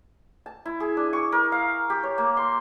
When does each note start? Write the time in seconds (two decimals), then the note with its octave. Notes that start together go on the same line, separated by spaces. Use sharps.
0.46 A5
0.65 E4
0.80 G#4
0.97 D4
1.13 C#6
1.32 A#4
1.52 F5
1.90 G4
2.03 C#5
2.18 A#3
2.37 C6